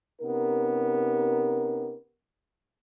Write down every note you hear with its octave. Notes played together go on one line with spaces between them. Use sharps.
C3 B3 C#4 D#4 G4 A#4